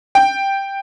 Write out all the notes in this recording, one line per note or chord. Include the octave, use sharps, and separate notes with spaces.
G5